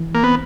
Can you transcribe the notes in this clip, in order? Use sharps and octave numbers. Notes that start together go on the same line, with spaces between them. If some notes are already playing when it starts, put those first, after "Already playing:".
Already playing: E3
A#3
B3 C4